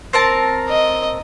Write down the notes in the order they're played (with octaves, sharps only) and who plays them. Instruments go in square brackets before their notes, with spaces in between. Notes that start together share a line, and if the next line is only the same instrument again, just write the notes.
[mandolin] C4 A#4 A5
[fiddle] D#5